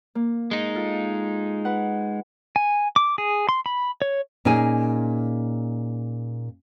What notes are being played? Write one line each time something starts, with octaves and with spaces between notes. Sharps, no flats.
A#3
G#3 D#4
F4 A4
B4 F#5
G#5
D6
G#4
C6
B5
C#5
A#2 C#4 D#4 G#4 G#5